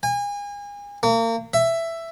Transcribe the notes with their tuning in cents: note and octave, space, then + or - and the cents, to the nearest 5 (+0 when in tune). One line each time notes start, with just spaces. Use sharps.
G#5 -35
A#3 -35
E5 +10